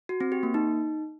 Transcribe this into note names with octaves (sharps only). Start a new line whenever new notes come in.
F#4
C4
G4
A#3
D#4